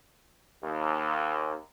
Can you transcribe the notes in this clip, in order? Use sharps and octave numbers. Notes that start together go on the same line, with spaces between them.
D#2